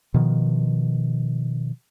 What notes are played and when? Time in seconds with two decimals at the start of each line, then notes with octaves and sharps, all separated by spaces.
0.14 B2 D#3 F3